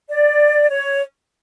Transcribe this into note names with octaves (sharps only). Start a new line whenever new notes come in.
D5
C#5